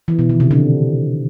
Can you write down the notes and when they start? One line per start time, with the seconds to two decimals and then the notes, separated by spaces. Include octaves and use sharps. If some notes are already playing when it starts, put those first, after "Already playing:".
0.08 E3
0.19 B2
0.29 D#3
0.40 C3
0.51 D3